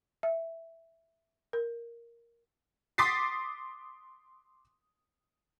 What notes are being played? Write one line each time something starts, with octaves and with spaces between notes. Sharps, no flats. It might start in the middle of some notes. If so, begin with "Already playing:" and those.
E5
A#4
C6 D6 D#6 A6 B6 C7